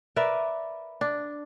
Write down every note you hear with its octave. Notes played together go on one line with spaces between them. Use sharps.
A#4 B4 D5 E5
D4